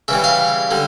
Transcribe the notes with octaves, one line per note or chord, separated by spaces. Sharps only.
C#3 E3 G3 E5
F5
D3 G3